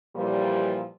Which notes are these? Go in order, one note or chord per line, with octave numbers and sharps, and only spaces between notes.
A#2 E3 F3 G3